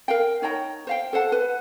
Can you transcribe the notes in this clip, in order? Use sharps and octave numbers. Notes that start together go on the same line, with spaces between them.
A#4 F5 G5
D#4 C#5 G5 A#5
C5 F5 G5
A4 C5 F#5 A5
B4